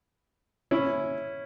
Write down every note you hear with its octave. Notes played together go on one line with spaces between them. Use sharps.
C#4 E4